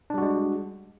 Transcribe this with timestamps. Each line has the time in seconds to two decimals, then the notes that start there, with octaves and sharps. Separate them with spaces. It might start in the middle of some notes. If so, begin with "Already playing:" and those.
0.10 D4
0.14 G3
0.18 F#4
0.22 G#3